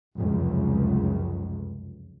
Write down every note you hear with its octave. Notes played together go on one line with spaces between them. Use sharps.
F1 C#2 F#2